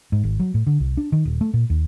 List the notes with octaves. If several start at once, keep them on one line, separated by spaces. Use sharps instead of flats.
G#2
G#1
F#3
A2
D3
C2
D4
D#3
D#1
A3
A#2
D#2